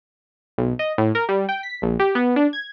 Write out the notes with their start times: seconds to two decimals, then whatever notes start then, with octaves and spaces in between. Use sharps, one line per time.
0.58 B1
0.79 D#5
0.98 A2
1.15 A#4
1.29 G3
1.49 G5
1.63 B6
1.82 A#1
1.99 G4
2.15 B3
2.36 D4
2.53 G#6